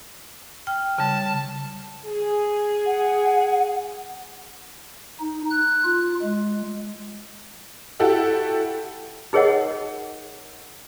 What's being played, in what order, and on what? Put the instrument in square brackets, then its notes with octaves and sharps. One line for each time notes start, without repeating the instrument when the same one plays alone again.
[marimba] G5 F6
[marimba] C#3 G3 [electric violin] A5
[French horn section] G#4
[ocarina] F#5
[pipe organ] D#4
F#6
F4
G#3
[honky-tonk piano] E4 F#4 G4 A4
[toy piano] D#4 G#4 A#4 C#5 D#5 F#5